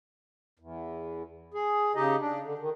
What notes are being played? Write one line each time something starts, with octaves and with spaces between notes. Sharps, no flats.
E2
G#4
C#3 D#4 G4 D#5
D4
D3
D#3